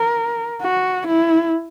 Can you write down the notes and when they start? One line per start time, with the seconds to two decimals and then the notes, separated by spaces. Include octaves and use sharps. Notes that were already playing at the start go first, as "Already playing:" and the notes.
Already playing: A#4
0.62 F#4
1.07 E4